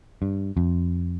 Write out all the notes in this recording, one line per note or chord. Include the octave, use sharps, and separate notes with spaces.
G2
F2